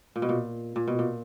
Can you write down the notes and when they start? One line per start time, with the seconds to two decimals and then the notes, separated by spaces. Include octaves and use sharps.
0.16 A#2
0.22 B2
0.29 A#2
0.76 A#2
0.87 B2
0.99 A#2